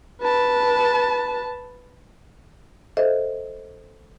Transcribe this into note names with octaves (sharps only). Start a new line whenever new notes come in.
B4 A5
A4 C5 D#5 E5